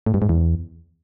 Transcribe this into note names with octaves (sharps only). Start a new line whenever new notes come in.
A2
G2
G#2
E2